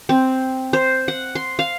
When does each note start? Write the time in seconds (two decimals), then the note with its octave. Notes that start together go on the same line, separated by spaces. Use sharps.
0.09 C4
0.73 C5
1.08 F#5
1.35 C6
1.59 F5